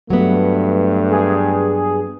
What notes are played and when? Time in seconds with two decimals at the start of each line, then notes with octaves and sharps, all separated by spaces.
0.10 G2 F#3 A3 B3
1.11 G#4